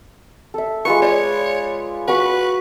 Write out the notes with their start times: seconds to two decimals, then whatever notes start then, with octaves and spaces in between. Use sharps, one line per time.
0.54 A4 E5
0.85 G#3 F4 B4 C#6
1.02 C#5 D5
2.08 F#4 B4 B5 C#6